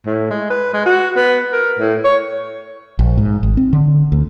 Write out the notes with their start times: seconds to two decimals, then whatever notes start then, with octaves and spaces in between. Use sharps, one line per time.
0.06 A2
0.31 G#3
0.50 B4
0.74 G#3
0.86 F#4
1.16 B3
1.53 A#4
1.79 A2
2.04 C#5
2.99 A#1
3.18 G#2
3.43 G#1
3.57 C4
3.73 D3
4.12 D2